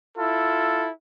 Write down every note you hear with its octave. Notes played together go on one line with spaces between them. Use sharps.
E4 F4 A4